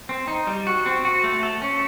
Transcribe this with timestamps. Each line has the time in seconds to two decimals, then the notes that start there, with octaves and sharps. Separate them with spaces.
0.09 C4
0.28 D#4
0.47 G3
0.67 F#4
0.86 C4
1.05 F#4
1.24 A3
1.43 A4
1.62 C#4